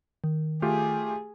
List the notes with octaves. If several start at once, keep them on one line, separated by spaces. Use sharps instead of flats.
D#3
A3 F4 G4 G#4